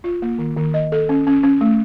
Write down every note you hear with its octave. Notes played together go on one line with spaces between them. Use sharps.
F4
A#3
D#3
D#3
D#5
A4
C#4
C#4
C#4
A3